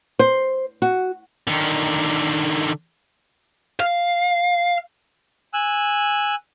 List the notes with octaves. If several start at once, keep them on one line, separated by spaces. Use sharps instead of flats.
C5
F#4
D3 D#3
F5
G#5 E6 F#6